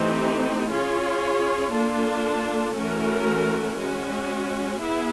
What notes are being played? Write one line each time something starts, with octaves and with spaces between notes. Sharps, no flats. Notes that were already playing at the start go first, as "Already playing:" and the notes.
Already playing: E3 A3 C4 D#4 G4
C#4 F4 G#4 C#5
A#3 D4 F4 A4
E3 A3 C#4 F#4 A#4
G#3 C#4 F#4
B3 E4 G#4